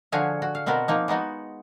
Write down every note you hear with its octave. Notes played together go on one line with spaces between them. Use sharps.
D3 F3 F#4 G#4 C#5 F5
F#4
F5
B2 B3 C4 F#4 A#4
F3 A#3 D#4
G#3 B3 D#4 F#4